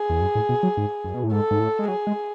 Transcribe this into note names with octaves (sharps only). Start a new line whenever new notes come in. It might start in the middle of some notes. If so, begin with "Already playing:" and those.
Already playing: G#4
E2
F#2
A2
B2
F#3
G#2
F#2
B2
A2
G#2 A4
G#2
A2
G#3
F#3 G#4
G#3